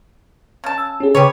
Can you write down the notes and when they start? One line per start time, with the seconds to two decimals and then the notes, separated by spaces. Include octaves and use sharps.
0.64 C#3 A5
0.78 E6
1.00 C#4 G#4
1.15 C#3 G4 B4 C#5